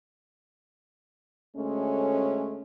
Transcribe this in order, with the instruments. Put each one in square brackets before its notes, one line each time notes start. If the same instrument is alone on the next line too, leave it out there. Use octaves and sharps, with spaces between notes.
[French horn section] D2 G#3 A3 C#4